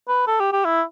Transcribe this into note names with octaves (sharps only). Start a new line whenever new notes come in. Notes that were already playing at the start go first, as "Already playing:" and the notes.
B4
A4
G4
G4
E4